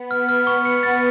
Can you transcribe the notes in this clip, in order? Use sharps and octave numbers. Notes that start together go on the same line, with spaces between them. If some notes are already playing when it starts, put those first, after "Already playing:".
Already playing: B3
F6
F6
C#6
C#7
A6